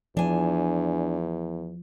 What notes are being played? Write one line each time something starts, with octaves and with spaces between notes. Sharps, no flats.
E2 F3 D4 G#5